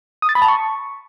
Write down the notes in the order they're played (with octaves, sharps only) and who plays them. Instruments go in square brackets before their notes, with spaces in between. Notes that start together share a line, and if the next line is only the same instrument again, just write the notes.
[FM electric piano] D#6
A6
B5
A5
C#6